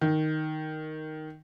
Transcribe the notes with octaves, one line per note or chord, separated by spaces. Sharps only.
D#3